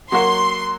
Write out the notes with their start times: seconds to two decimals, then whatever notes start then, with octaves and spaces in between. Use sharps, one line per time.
0.12 F#3 A#3 F#4 C6